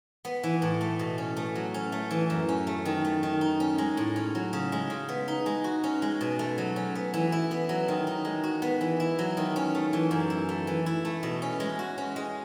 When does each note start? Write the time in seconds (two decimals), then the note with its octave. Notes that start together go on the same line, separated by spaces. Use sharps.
0.25 B3
0.43 E3
0.62 A2
0.81 A3
0.99 B2
1.18 C#4
1.37 A3
1.55 F#3
1.74 C#4
1.92 A3
2.11 E3
2.30 F#2
2.49 C#4
2.67 A3
2.85 D#3
3.05 A3
3.23 D#3
3.41 D#4
3.60 C#4
3.78 G#3
3.97 A2
4.16 C#4
4.35 F#3
4.53 C#3
4.72 G#3
4.90 C#3
5.09 B3
5.28 D#4
5.46 G#3
5.64 F#4
5.84 C#4
6.02 G#3
6.21 B2
6.39 A3
6.58 F#3
6.76 C#4
6.95 B3
7.14 E3
7.32 E4
7.51 B3
7.69 F#3
7.88 D#3
8.07 D#4
8.25 G#3
8.44 F#4
8.62 B3
8.81 E3
9.00 E4
9.19 F#3
9.37 D#3
9.56 C#4
9.75 A3
9.93 E3
10.11 F#2
10.30 E4
10.49 A3
10.67 E3
10.86 E4
11.05 A3
11.23 B2
11.42 C#4
11.60 G#3
11.79 F#4
11.98 C#4
12.16 G#3